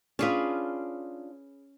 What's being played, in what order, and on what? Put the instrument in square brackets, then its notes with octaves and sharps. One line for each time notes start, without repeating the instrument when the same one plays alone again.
[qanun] C#4 G#4 B4 [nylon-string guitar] D4 F4